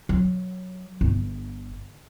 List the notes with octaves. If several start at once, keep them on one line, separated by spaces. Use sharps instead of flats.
F#3
G1